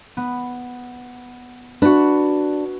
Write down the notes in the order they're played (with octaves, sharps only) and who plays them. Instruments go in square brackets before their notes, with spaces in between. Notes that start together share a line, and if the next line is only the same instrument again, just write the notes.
[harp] B3
[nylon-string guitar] D4 [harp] F#4 B4